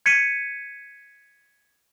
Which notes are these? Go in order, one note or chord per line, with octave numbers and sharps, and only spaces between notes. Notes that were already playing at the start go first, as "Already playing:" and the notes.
G#6 B6 C#7 D#7